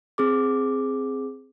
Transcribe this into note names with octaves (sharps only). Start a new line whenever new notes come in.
C4 G#4 D6